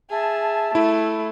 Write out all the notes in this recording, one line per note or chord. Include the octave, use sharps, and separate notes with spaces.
G#4 E5 A5
A3 E4